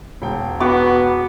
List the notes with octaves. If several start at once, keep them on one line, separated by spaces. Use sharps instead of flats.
E1 G5
B3 F#4 D6